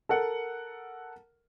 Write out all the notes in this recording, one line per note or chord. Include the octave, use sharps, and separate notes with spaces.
A4 A#4 F#5